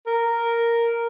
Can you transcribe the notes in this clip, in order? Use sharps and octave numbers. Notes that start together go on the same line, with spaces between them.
A#4